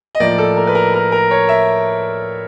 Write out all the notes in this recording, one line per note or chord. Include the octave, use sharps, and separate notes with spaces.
D#5
A2 F3 A#3 D5
A4
A#4
B4
A#4
A#4
A#4
C#5
E5